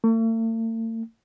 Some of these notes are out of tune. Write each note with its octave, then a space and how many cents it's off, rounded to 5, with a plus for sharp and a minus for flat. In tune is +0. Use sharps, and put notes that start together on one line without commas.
A3 +45